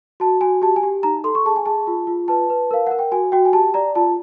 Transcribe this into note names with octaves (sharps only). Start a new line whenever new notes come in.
F#4 A5
F#4 G#5
G4 A5
G#5
G4
D#4 A#5
A4 C6
C#6
G#4 A5
G#5
G#4 A5
F4
F4
B4 A5
B4
A#4 F5
A#4 F#5
G5
F#4 G#5
F#4 G5
G#5
G4 A5
D5 A#5
F4 A5